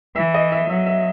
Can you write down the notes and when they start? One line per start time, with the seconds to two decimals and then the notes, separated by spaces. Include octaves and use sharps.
0.16 E3 E5
0.34 D#5
0.52 E5
0.69 F#3 E5
0.86 E5